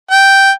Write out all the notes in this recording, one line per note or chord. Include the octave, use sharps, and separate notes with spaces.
G5